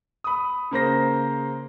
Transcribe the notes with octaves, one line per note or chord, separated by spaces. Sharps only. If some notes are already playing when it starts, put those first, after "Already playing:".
B5 D#6
C#3 A#3 C5 A#6